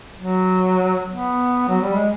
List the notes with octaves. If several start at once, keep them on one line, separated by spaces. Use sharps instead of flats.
F#3
B3
F#3
G3
G#3